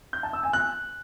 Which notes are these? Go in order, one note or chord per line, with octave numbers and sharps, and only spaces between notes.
G6
A5
E6
G#5
F#6